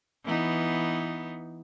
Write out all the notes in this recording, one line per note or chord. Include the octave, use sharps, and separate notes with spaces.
E3 B3 D#4